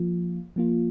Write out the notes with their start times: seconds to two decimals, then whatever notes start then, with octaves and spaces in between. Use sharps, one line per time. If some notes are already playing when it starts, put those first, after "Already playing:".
Already playing: F3 A#3 F4
0.56 F3 A#3 F4